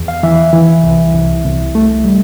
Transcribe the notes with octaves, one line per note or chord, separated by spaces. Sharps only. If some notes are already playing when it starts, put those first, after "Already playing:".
Already playing: E2
F5
E3 E5
E3
C2
C2
C2
A3
G3